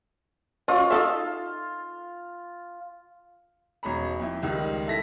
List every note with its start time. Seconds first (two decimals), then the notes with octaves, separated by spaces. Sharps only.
0.68 F#3 C#4 F4 D#5
0.91 D#4 A4 E5
3.83 E1 C#4 D#4 A#5 B5
4.20 F2 E4
4.42 C#2 D#3 G3 D#4
4.87 E4 A4 A#6 B6